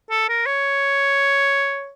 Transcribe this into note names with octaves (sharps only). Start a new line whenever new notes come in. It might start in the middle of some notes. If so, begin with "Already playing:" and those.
A4
A#4
C#5